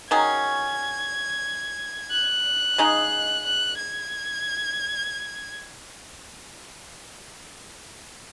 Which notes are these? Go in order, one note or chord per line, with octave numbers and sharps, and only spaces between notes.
D#3 F#3 C#4 G#4 G#6
F#6
C#3 G#3 D#4 G#4
F#6
G#6